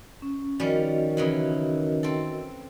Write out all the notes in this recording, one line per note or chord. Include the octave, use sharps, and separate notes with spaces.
C#4
D#3 F3 G3 C#4 F#4 A#4 D#5
C#3 E3 F#3
C4 A4